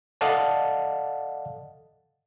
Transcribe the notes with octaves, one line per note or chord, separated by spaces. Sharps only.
A4 D5 D#5 F5 F#5 A5